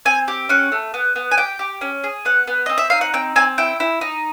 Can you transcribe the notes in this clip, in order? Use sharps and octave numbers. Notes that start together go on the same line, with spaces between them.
C4 G#5
G4
C#4 F#5
A3
B3
B3
G#5
G4 G5
G4
C#4
G#4
B3 F#5
B3
C4 D#5
E5
D#4 F5
F#5
C4 G5
C4 G#5
E4 G5
E4
D#4